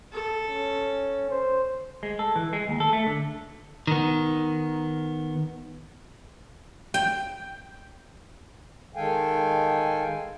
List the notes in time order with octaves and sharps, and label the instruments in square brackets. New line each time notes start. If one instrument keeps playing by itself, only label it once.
[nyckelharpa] A4
[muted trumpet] C#4
C5
[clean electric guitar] G#3
A4
E3
G#3
D#2
A4
A3
D3
D#3 B3
[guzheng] G5
[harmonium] D#3 G#3 A4 F5 G5 G#5